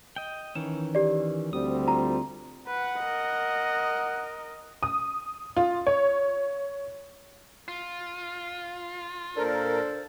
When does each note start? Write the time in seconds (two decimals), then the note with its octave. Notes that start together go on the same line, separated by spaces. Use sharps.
0.16 D#5 G5
0.55 D#3 E3 C#4 E7
0.95 G4 D5
1.53 D2 G3 C4 D#6
1.88 F4 A#5
2.67 B4 F#5
3.01 A#4 D#5
4.83 D#6
5.57 F4
5.87 C#5
7.68 F4
9.36 A#2 D4 A4 A#4 C5